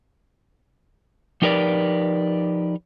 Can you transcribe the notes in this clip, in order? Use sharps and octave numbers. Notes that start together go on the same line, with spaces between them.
F3 D#4 G4 A#4 B4 D5